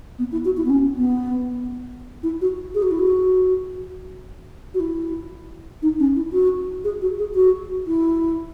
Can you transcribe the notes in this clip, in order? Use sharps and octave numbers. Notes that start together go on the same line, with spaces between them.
B3
E4
F#4
E4
B3
C#4
B3
E4
F#4
G#4
F#4
E4
F#4
F#4
E4
D#4
C#4
E4
F#4
G#4
F#4
G#4
F#4
E4